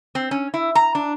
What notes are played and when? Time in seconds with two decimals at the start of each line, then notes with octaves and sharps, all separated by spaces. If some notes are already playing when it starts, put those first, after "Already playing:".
0.15 C4
0.31 C#4
0.54 E4
0.75 A#5
0.95 D4